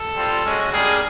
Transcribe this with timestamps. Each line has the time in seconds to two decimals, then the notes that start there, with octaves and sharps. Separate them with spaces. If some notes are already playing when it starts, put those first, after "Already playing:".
Already playing: A4
0.15 G3 C4 F4
0.44 G#3 C#4 F#4
0.72 G3 A#3 D4 G#4